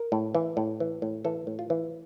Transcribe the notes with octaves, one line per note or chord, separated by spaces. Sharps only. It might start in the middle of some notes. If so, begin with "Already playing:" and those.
Already playing: A#4
A2
E3
A2
E3
A2
E3 A4
A2
F4
E3